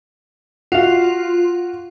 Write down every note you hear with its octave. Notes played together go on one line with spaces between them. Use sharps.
F4 F#4 F5